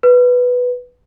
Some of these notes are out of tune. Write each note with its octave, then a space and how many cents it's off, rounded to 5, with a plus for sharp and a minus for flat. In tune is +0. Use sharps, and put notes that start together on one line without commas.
B4 +0